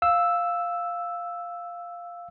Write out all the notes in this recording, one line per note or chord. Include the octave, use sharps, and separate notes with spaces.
F5 E6